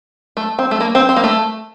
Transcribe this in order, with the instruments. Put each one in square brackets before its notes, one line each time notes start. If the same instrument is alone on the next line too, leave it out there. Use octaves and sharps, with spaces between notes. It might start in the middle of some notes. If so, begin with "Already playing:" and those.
[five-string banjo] A3
C4
A3
A#3
C4
C4
A#3
A3